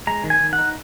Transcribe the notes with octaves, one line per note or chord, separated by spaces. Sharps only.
G#3 A#5
D#3
G#5
D#3
F#5
D#4